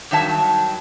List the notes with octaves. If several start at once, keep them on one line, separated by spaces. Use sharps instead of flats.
G2 D#3 F#3 E5 A5